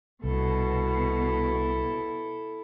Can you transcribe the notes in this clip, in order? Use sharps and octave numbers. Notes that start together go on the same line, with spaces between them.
C2 B2 E4 A4